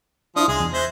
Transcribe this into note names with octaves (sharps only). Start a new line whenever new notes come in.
F3 D4 E4 D#6
C2 G#3 G#4
E2
C5 E5 F#6 G#6 A#6